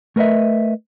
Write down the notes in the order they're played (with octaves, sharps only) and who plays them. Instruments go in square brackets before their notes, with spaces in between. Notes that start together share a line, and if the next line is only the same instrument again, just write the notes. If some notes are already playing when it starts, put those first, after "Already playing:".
[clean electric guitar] A3 A#4 B4 D#5 E5